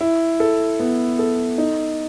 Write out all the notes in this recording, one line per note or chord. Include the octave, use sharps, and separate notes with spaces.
E4
A4
B3
A4
D#4